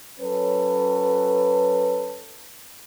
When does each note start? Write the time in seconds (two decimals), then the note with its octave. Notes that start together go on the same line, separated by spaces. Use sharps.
0.19 F#3 C#4 A4 B4